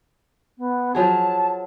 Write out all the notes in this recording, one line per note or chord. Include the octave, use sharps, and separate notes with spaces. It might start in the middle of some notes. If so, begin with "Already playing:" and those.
B3
F3 F#3 G#4 A5